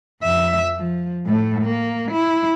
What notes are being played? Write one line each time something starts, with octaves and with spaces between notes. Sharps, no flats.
F2 E5
F3
A2 A3
A#3
E4